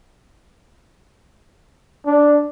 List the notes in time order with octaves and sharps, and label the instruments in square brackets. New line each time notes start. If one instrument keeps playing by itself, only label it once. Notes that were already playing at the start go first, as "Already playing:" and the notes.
[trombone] D4